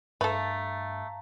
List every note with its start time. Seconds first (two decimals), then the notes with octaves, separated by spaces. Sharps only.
0.21 G2 A3 A4 B4 F5 A5 A#5